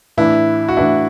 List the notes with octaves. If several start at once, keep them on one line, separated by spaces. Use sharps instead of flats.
A2 E3 D4 E4
F#4
A2 E3 D4 E4